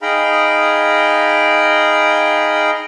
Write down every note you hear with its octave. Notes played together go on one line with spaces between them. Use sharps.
D#4 G#4 F5 G5 A#5 B5